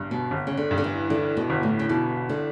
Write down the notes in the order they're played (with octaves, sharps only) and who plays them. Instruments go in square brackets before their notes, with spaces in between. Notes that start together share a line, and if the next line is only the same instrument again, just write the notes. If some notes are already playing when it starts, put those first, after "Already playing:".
Already playing: [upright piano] G1 G2
[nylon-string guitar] B2
[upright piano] G1
[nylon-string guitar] C#3
D3
[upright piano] G2
[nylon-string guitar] D3
E3
[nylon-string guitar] D3 [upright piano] E3
[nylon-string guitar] B2
[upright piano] G1
[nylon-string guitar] A2
C#3
[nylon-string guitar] B2 [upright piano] E3
[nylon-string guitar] D3